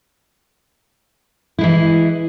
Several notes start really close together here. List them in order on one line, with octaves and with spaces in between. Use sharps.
E4 G#3 E3